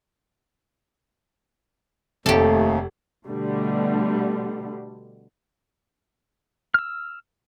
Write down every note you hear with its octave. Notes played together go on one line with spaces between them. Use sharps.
F1 D#2 C3 A3 G4 A4
B2 D3 G3 A3
E6 F6